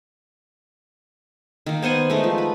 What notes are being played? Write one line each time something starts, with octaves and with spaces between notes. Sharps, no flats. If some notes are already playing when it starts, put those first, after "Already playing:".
D#3 A#3
B3 C5 F#5 G#5
G#3 A3 D#4
F3
B4